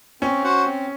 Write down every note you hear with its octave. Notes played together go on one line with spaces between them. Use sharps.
C4 C#4
F#4 C5 F#5
C4